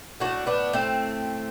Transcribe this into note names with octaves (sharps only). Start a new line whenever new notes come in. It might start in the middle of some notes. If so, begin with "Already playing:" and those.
A2 E3 A3 D4 F#4
B3 D4
A3 C4